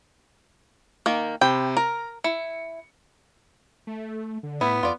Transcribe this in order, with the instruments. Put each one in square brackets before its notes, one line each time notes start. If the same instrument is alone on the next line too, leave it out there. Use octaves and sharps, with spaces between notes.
[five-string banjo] D#3 A#3
[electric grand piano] C3 C5 B5 [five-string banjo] G5
[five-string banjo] A#4 [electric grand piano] A#5
[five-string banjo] E4 [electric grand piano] C#7
[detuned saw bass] A3
D3
[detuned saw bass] A2 [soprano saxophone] B3 [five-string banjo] E4
[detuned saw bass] F2 [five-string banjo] F4 D5